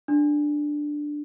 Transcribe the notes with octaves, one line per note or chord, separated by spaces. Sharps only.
D4